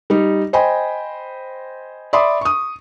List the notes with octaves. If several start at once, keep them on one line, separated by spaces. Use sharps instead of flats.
G3 D#4
C5 D#5 G5 G#5 B5
D5 E5 B5 C6 D6 D#6
C#6 D#6